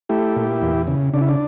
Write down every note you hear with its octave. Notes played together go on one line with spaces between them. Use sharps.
A3 E4 G4
A#2
E2
C#3
C#3 D4
E4
D4